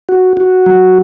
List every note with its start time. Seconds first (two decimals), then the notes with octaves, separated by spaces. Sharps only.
0.09 F#4
0.37 F#4
0.66 F#3